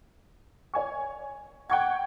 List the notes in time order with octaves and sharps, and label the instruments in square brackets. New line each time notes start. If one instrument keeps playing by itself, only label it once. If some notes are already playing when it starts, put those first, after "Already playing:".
[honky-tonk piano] C#5 G#5 C#6
[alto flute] F#5 [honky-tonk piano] G5 C#6 G#6